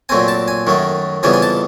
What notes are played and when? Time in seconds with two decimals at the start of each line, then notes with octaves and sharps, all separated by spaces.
0.09 A#2 F#3 A3 C4 G#5
0.28 A5
0.48 G#5
0.67 F#2 D#3 F#3 A3
1.23 F2 C#3 E3 G3 B3 G#5
1.33 G#5
1.42 A5